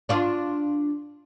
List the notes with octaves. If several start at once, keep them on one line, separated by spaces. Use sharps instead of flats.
D4 F4 D5